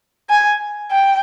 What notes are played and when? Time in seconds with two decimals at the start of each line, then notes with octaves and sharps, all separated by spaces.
0.30 G#5
0.91 G5